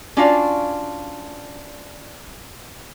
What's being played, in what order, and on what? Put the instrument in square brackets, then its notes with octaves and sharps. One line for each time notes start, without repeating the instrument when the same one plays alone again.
[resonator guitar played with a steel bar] C#4 D4 F4 F#4 D5 F5